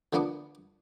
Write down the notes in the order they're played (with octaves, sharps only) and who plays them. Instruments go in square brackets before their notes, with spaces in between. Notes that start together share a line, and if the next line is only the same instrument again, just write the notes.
[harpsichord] D3 F3 A#3 B3 D4